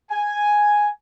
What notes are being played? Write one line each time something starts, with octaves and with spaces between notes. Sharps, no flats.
G#5